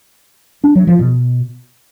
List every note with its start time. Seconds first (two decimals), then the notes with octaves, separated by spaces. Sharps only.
0.64 D4
0.75 F#3
0.87 F3
0.99 B2